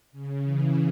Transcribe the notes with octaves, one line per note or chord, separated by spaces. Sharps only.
C#3
E3